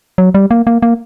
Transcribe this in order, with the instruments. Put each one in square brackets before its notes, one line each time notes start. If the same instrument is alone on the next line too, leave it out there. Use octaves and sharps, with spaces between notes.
[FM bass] F#3
G3
A#3
A#3
A#3